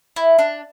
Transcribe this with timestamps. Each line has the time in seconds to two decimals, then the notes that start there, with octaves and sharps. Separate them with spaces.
0.16 E4
0.39 D4